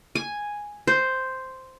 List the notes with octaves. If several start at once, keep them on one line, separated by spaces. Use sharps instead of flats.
G#5
C5